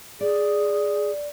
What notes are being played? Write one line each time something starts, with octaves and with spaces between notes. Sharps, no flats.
G#4 D5